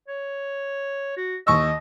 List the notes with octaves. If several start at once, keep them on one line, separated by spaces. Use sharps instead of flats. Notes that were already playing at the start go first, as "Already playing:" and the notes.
C#5
F#4
D#2 D#5 C#6 E6